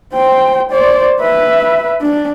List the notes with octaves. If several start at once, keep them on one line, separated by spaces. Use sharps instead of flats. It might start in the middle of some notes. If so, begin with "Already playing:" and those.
C5 G5
C5 D5
B4 E5
D4